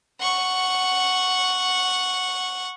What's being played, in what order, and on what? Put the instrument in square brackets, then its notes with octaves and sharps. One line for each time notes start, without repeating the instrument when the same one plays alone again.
[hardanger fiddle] F#5 C#6